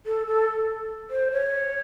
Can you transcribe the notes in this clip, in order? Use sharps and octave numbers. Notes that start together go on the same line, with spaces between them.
A4
A4
C5
C#5